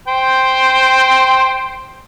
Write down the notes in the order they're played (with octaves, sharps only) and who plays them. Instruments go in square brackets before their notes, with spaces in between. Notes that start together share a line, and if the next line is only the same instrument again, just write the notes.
[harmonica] C5 G5